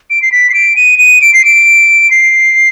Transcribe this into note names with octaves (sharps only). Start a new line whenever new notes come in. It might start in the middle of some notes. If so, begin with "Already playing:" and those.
D7
C7
B6
C7
D7
D#7
D#7
D7
C7
D7
C7